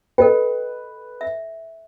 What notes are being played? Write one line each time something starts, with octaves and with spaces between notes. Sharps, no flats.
A4 B4 D#5 G5
E5